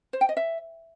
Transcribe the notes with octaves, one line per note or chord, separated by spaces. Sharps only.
C5
G5
D#5
E5